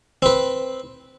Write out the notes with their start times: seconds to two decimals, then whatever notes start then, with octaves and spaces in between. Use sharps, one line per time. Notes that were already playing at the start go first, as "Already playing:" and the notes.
0.22 C4 B4